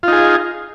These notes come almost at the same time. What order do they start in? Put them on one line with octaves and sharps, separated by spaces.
F4 D#4 G#4